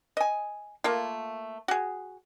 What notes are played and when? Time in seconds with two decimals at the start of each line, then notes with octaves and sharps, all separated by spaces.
0.17 D#5 G#5
0.84 A3 A#3 F4
1.68 F#4 G#4